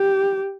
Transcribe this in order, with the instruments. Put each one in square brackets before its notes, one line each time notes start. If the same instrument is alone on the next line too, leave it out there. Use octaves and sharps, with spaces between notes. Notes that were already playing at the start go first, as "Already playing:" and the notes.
Already playing: [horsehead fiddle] G4